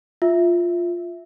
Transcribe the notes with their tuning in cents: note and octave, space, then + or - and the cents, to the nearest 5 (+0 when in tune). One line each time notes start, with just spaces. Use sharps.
F4 +0 E5 +0